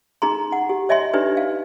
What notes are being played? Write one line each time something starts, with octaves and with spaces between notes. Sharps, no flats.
D#4 G#4 A#5 C6
F#5
G4
C#5 D#5 E5 G#5 C6
D4 D#4 G4 B4 D5
F5